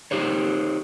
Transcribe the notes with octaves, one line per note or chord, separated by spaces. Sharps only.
D#4 G4 C5 C#5